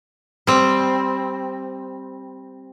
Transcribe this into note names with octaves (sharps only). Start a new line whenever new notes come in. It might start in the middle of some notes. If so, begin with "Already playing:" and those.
G3 C4